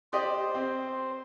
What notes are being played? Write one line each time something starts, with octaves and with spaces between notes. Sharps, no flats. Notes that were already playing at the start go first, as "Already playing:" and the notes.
G4 C5 D5 D#5
C4